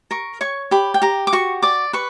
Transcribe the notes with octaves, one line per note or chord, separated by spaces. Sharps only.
A#4 C#6
C#5 C#6
G4 B5
G5
G4 A#5
D6
F#4 C#6
D5 D6
B4 C#6